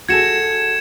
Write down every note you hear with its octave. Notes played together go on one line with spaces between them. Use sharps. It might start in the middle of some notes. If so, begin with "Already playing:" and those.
F#4 G#4 A4 G#6 C#7 E7